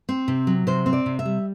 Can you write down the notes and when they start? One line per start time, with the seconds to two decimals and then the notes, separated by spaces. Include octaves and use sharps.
0.09 C4
0.28 C3
0.47 F#3
0.67 C3 C5
0.86 C4
0.93 D5
1.06 C3
1.19 E5
1.25 G3